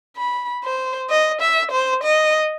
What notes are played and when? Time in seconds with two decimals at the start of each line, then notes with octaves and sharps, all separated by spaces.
0.17 B5
0.63 C5
1.10 D#5
1.41 E5
1.72 C5
2.03 D#5